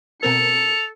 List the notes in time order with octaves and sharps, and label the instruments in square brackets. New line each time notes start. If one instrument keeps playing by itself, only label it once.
[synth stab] B2 C4 A#4 [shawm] A4 [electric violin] C#7 [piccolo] F7